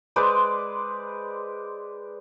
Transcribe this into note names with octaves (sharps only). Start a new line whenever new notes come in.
G#3 B4 C5 D5